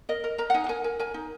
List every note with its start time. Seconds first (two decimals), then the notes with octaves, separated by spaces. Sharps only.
0.09 A#4 D#5
0.24 A#4
0.38 A#4 A#5
0.50 F#5
0.54 D#4 G#5
0.64 F#5
0.69 A#4 G#5
0.84 A#4 G#5
0.99 A#4 G#5
1.14 D#4